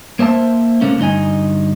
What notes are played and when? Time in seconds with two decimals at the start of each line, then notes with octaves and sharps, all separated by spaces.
0.19 A#3 C5 E5 A5
0.81 C3 A3 A#3 C#4
0.99 D2 G2 D#4 D#5 G#5